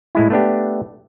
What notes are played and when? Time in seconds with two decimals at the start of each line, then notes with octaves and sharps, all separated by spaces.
0.15 A2 G#3 E4
0.30 A3 B3 D4 G4